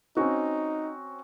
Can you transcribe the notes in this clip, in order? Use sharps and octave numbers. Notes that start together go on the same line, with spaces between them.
C4 C#4 D#4 F#4